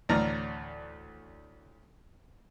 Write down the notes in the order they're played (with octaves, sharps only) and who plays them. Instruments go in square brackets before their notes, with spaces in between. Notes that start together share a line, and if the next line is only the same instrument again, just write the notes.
[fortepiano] D2 A2 E3 D5 A#5 F6